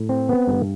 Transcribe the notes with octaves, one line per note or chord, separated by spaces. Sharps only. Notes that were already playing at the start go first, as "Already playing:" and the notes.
Already playing: A2
C4
B3
G2